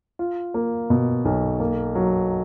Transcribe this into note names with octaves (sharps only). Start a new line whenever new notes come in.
F4
A#3
B2
B1
A#3
F#3